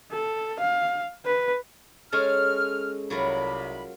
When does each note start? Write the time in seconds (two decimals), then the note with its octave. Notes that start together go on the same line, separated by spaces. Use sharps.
0.11 A4
0.59 F5
1.25 B4
2.12 G#3 C#4 A4 F6
3.10 C2 C3 F#3 F4 A#4 B5